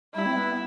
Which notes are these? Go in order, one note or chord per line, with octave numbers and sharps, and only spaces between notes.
G3 E4
C4
B3